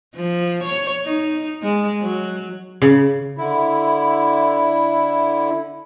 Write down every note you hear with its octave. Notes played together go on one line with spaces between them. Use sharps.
F3
C#5
D#4
G#3
F#3
C#3
D3 E4